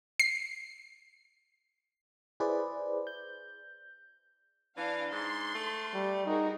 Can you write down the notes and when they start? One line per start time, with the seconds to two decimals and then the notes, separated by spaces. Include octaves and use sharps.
0.20 C7
2.40 E4 G#4 B4 C5 D5
3.07 G6
4.77 E3 D4 F5
5.12 G#2 C6
5.55 A3
5.94 G3
6.26 D#4 F#4 G#4 A#4